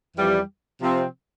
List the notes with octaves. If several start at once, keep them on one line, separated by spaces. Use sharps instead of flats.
F2 E3 G3
C3 F3 C4